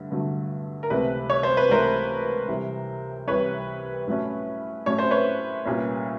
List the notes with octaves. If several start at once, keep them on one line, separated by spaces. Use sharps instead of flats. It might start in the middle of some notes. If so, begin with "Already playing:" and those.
Already playing: G2 D3 A3
G2 D3 F#3 A3
A#4
C#2 C3 E3 A3 C4 B4
C#5
C5
B4
C#2 C3 E3 A3 C4 A#4 C5
C2 C3 E3
C2 C3 E3 B4 C#5
A2 F#3 A3 C#4
A2 F#3 A3 C#4 C#5
C5
B4 C#5
C2 A#2 G3 A#3 C#4